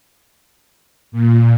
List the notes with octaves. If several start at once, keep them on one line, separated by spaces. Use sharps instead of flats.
A#2